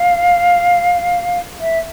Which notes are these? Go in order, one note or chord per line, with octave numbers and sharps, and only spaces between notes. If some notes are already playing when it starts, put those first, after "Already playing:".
Already playing: F5
E5